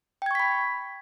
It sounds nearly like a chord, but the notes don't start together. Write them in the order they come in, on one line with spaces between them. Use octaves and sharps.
G5 G#6 C#6 B6 B5